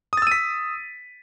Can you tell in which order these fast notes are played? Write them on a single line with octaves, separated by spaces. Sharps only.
D#6 A6 E6 D#7 B6